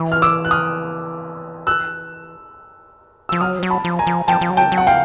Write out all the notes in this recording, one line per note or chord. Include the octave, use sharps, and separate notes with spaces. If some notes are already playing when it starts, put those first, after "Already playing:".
Already playing: E3
F6
D6 E6
F#6
D#6 F6
E6 F#6
F3 E6
F#3 D#6 F6
F3
F#3
A5 B5
F3
G#5 A#5
F3
F3 G5 A5
F3
F#3
G5 A5
F#3
F#5
F5 G5